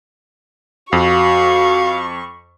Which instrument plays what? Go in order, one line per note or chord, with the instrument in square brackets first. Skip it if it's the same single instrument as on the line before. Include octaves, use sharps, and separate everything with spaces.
[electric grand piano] F2 [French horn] F#4 [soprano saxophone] F5 [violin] C#6